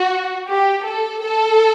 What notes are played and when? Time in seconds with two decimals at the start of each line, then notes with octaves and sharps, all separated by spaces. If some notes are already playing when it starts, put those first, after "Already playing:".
Already playing: F#4
0.49 G4
0.85 A4
1.23 A4